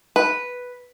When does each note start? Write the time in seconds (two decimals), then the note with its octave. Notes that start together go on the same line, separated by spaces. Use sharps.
0.16 B4